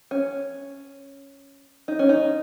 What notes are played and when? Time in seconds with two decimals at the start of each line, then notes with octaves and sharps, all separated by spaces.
0.11 C#4
1.88 D#4
1.99 C#4
2.09 D#4